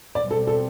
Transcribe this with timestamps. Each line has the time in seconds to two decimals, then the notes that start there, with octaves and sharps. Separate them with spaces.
0.15 B2 G3 C4 D5
0.31 A4
0.47 A4